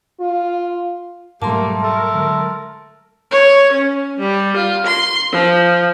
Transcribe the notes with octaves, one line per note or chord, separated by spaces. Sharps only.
F4
G#2 B2 F#3 G3 A3 A#3 A5 C6
A3 A#4
D3 F#3 G#3
C#5
C#4
G3
F4
C6
F3